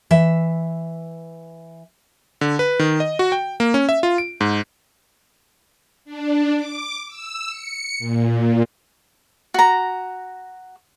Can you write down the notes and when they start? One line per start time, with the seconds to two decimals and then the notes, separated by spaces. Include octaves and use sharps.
0.11 E3 E5
2.41 D3
2.59 B4
2.79 D#3
3.00 D#5
3.19 F#4
3.32 G5
3.60 A#3
3.74 C#4
3.89 E5
4.03 F4
4.18 D7
4.41 G#2
6.05 D4
6.55 D6
7.08 E6
7.49 C#7
7.99 A#2
9.54 F#4 A#5